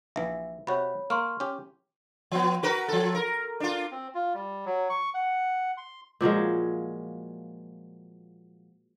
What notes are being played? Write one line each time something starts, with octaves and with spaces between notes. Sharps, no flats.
A#1 E3 E5
C3 F#4 C#5 B5
A#3 C6 C#6 F6
C#4 G4
F3 B3
F#4 A#4 B4
F3 A4
A#4
D4 F4
C4
F4
G3
F#3
C#6
F#5
C6
A#2 F3 F#3 G#3